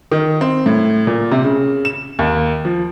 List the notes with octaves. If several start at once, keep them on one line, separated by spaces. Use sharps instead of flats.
D#3
C4
A2
A#2
C3
C#3
E7
D#2
F3